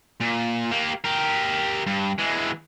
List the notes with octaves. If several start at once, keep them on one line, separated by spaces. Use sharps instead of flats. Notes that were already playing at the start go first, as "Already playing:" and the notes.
A#2
A#3 G4
G4 A#4
G2
E3 G#3